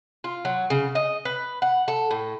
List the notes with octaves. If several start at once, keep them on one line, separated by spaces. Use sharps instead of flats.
F4
F#3
C#3
D#5
B4
F#5
A4
A2